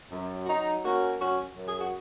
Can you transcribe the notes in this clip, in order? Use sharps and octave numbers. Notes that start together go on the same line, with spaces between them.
F#2
F#4
F#3 D#4
A#3 C#4 F#4
F#2 C#4 F#4
F#2
G#4
F#4